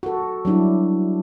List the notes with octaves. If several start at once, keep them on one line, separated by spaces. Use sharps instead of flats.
F#4 A4
F#3 G3 D4 E4